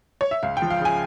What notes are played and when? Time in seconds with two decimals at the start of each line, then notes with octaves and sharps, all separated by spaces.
0.21 C#5
0.31 E5
0.43 C#2 F5
0.57 G5
0.62 F3
0.70 F5
0.80 C#3
0.85 G#5